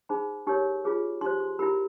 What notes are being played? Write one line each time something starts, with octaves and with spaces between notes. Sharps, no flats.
D#4 G#4 C5 B5
D#4 G4 A#4 C#5 C#6
F4 G#4 B4
D#4 G4 C5 C6
C6
E4 G4 A#4 B5